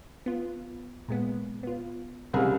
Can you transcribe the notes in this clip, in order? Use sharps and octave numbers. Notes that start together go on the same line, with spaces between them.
B3 F4
A#2 G#3 B3
B3 F4
C2 C#3 C4 G#4 A#4